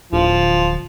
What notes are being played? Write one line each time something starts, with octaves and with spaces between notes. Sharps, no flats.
D1 F3